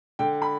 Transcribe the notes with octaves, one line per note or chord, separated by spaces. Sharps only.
D3 G5
B5